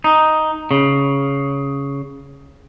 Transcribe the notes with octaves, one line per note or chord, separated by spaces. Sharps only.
D#4
C#3